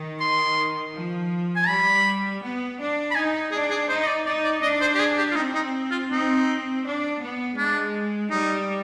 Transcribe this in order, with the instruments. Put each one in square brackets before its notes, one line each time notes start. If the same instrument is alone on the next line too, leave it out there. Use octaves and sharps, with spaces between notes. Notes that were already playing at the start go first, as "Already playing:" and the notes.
Already playing: [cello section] D#3
[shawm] C6
[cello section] F3
[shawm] G#5
[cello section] G3 [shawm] B5
[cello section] B3
D4
[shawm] B5
[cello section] D#4 [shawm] G#5
[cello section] D4 [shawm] G#4
[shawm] G#4
[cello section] D#4 [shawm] C5
[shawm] D#5
D5
[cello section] D#4 [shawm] D5
[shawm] D5
[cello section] D4 [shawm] D#5
[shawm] C5
G4
G#4
G4
F4
[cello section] C4 [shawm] D#4
[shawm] D#4
F4
[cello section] C4 [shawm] D#4
[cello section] D4
B3
[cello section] G#3 [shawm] D4
[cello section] G3 [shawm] D#4